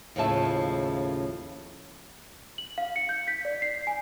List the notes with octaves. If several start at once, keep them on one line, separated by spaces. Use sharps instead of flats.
D#2 A2 C#3 F3 E5 A5
F#7
F5
C#7
G6
B6
D5
C7
G#5